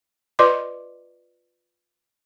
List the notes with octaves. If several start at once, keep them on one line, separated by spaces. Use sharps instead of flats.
F4 B4 D5 D#5 C6 D6